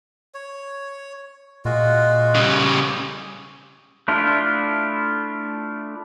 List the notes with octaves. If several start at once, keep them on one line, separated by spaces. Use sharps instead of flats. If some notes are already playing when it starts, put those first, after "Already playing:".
C#5
A#2 G#3 F4 F#4
C#3 G3
A3 D4 E4 F4